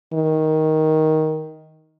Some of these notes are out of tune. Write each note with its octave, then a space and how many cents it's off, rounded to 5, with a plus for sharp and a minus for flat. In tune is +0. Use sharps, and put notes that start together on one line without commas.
D#3 +10